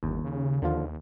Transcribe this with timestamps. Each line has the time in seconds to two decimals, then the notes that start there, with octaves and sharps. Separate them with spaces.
0.03 G1 D#2
0.24 C#3
0.62 D#2 D3 F3 F4